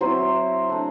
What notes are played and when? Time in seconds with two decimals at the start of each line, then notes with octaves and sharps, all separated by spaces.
0.01 F#3 C4 E4 C5
0.69 A3 D4